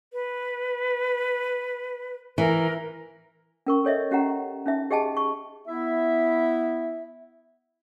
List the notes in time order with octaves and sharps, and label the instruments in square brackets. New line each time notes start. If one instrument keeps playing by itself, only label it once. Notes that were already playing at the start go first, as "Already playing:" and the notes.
[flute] B4
[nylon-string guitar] E3 [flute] A#4
[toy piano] C#4 A#4 C#6
A4 C#5 D#5 E5
C#4 G4 F#5 A#5
C#4 D#4 E5
G4 G#4 D#5 G5 A5
C#6
[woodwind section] B3 E4 E5